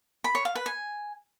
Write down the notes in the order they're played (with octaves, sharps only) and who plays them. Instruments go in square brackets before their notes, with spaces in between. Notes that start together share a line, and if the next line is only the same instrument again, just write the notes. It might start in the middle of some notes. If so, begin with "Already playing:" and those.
[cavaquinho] B5
C#5
F5
B4
G#5